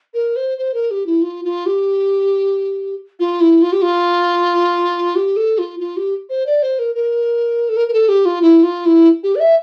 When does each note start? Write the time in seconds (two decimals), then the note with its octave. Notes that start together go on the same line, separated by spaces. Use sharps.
0.14 A#4
0.36 C5
0.58 C5
0.74 A#4
0.91 G4
1.06 E4
1.22 F4
1.44 F4
1.66 G4
3.20 F4
3.41 E4
3.62 F4
3.72 G4
3.82 F4
5.16 G4
5.36 A4
5.58 F4
5.80 F4
5.97 G4
6.29 C5
6.46 D5
6.63 C5
6.79 A#4
6.95 A#4
7.69 A4
7.77 A#4
7.88 A#4
7.93 A4
8.09 G4
8.25 F4
8.42 E4
8.63 F4
8.86 E4
9.23 G4
9.35 D5
9.40 E5